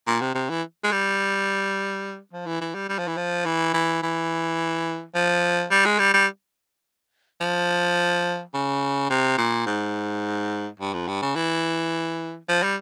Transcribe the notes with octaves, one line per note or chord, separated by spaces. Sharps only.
A#2
C3
C3
E3
G#3
G3
F3
E3
E3
G3
G3
F3
E3
F3
E3
E3
E3
F3
G3
G#3
G3
G3
F3
C#3
C3
A#2
G#2
G2
F2
G2
C#3
E3
F3
G3